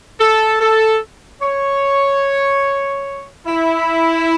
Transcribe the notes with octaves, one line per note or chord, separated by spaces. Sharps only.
A4
A4
C#5
E4